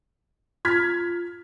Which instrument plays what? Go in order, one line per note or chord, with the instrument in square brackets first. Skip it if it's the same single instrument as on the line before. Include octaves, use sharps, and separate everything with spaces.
[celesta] F4 [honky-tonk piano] F6 G#6 B6